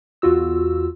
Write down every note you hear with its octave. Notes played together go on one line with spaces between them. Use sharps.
E2 F4 F#4 E6